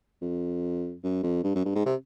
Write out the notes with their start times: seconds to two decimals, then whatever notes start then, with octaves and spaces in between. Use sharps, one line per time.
0.22 F2
1.03 F#2
1.23 F2
1.44 G2
1.55 F#2
1.65 G2
1.75 G#2
1.86 C3